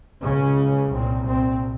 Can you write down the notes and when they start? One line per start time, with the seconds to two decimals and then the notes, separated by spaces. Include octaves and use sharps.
0.23 C#2 C#3 C#4
0.92 C2 A#2 C4
1.27 C4